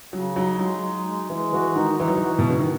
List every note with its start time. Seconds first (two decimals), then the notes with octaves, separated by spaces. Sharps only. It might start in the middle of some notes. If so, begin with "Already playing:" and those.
0.13 C#3 F#3
0.36 F#3 D#4
0.59 F#3 G#3
0.82 D#4
1.06 G#3
1.29 E3 G#3
1.52 E3 F#4
1.76 D#3 D#4
1.99 E3 D#4
2.08 F#3
2.16 E3
2.22 F#4
2.39 B2
2.46 C#3 F#4
2.59 D#3